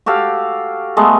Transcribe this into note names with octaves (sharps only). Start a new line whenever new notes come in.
F#4 G4 A4 F5
G#3 A3 B3